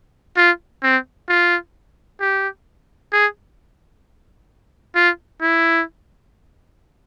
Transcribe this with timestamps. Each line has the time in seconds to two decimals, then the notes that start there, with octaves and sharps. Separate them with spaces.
0.37 F4
0.83 C4
1.29 F4
2.20 G4
3.12 G#4
4.95 F4
5.42 E4